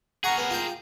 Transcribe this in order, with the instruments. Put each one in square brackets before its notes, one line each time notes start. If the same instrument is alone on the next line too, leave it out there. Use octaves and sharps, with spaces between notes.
[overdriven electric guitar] G#4 A#4 [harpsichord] F#5 A#5 C#6
[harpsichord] B3
F4 G5